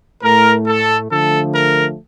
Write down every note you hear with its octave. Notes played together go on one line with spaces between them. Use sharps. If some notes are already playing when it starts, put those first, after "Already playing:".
A2 A3 A#4
A4
D3 F3 A3 A4
A#4